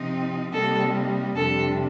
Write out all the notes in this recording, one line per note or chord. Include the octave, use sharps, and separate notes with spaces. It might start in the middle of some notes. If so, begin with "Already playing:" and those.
Already playing: C3 F3 C4 D#4
C3 G3 A#3 D#4 A4
F2 C3 G3 D4 A4